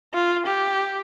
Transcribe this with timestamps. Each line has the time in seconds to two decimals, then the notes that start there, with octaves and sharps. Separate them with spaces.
0.14 F4
0.46 G4